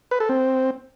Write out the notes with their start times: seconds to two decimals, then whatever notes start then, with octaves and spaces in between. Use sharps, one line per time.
0.11 B4
0.20 A4
0.29 C4